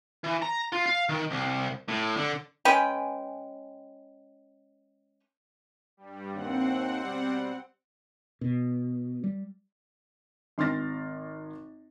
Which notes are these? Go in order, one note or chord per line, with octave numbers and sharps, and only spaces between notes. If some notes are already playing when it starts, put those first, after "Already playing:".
E3
A#5
F4
F5
D#3
C2
A2
D3
G#3 C#4 B4 G5
G2 G3
D#2 C4 F#5
B2 G3
B2
G3
G#1 C6 F6 A6 A#6